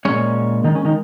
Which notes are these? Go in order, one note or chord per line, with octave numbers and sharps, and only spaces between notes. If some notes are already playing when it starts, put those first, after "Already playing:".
A#2 G#3 C#4 C#5
D#3 D#4
C#4
D#3 D#4